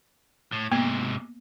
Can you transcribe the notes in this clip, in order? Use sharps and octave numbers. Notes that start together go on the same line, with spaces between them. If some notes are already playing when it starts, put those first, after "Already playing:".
A2
G#2 C3 A#3 B3